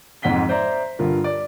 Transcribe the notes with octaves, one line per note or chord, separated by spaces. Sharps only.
F2 G#2 F#5 B6 G7
C5 D5 E5 A#5
G2 D3 F4 A#4
D5